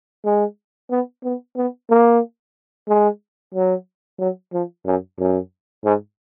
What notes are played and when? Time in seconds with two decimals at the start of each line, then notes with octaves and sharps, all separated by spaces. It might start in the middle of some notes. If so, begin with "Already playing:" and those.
0.25 G#3
0.91 B3
1.24 B3
1.56 B3
1.90 A#3
2.88 G#3
3.55 F#3
4.20 F#3
4.53 F3
4.86 F#2
5.19 F#2
5.84 G#2